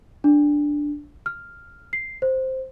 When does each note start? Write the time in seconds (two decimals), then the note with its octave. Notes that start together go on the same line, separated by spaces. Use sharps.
0.24 D4
1.26 F6
1.93 C7
2.22 C5